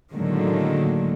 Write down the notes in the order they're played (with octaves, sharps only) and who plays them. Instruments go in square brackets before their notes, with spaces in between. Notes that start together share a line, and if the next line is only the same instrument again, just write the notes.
[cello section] A2 D3 D#3 F#3 G#3 A#3